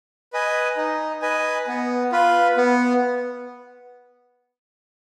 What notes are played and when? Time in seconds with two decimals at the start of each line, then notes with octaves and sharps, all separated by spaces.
0.33 B4 D#5 G#5
0.77 D#4
1.22 B4 D#5 G#5
1.67 B3
2.12 F4 B4
2.57 B3